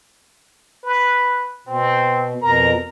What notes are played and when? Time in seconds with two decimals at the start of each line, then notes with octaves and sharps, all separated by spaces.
0.83 B4
1.67 B2 C4
2.42 F2 B2 A#4 A#5